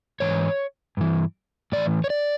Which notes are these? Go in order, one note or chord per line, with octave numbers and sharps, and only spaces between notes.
G#2 E3 C#5
G2 E3
A2 E3 D5
C#5
D5